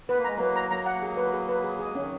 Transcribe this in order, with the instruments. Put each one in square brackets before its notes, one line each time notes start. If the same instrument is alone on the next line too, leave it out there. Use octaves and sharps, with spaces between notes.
[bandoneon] B3 [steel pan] B4
[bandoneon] A#3
[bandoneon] G#3 [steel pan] A#5
[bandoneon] F#3 A#3 [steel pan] B4
[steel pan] A#5
[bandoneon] F#3 A#3 [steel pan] A#5
[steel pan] F#5
G#4
B4
G#4
B4
G#4
G#4
[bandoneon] G#3
[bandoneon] D#3 F#3 [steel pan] C#4